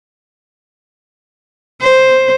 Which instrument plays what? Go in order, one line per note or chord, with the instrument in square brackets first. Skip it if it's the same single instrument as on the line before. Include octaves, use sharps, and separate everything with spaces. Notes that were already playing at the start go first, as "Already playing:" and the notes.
[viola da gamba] C5